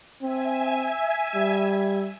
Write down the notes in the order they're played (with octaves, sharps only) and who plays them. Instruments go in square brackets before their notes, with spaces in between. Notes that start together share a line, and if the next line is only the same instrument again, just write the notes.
[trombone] C4 [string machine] E5 G#5
[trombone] G3